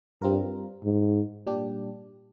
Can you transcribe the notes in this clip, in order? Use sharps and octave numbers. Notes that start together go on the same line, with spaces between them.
G2 G3 C4 F4 A#4
G#2
A#2 G3 D4 G4